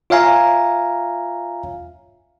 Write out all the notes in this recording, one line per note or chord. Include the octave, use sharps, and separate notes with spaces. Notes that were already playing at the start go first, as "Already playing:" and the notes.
F4 C#5 E5 F5 G#5 A#5